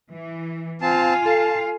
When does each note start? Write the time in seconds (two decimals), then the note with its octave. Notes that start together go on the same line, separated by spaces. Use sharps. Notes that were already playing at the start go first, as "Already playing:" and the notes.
0.11 E3
0.82 C4 F4 F5 G#5 A5
1.25 A4 A5